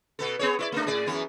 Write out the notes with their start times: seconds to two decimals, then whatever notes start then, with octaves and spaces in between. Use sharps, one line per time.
0.19 B2 B3 A4
0.39 B3 G#4 C#5
0.59 E4 B4 D5
0.72 A3 D4
0.87 A2 G#4 D5
1.07 F#2 E3 B3